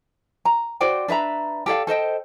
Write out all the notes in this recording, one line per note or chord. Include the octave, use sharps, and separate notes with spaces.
A#5
F#4 C5 D5 G5
D4 B4 E5 A#5
G4 A4 D5 F5
A4 C5 D#5 G5